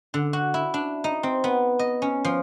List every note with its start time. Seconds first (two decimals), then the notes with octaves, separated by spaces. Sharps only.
0.14 D3
0.33 F#4
0.54 E4
0.74 D4
1.04 D#4
1.23 C4
1.44 B3
1.79 D#5
2.02 C#4
2.25 F3